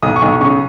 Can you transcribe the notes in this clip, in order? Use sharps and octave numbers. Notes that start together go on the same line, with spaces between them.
B1 D#6
C#6
B1
C#6
C#3 C#6